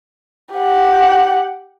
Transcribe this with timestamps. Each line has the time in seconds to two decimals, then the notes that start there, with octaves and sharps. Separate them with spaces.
0.54 G4 F#5